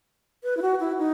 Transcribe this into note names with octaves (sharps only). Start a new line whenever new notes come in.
B4
E4
F#4
E4
D#4